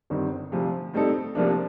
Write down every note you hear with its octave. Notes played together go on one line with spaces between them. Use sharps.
G1 G2 D#3 G3 C4
D2 C3 F3
A2 G3 C4 D#4 A4
C2 C3 F3 A#3 D4